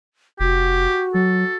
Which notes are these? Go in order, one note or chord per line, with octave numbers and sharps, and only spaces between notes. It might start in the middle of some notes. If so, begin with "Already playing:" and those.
F1 F#4 G4
F#3 A4